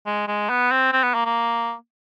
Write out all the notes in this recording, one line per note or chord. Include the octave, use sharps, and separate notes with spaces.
G#3
G#3
B3
C4
C4
B3
A#3
A#3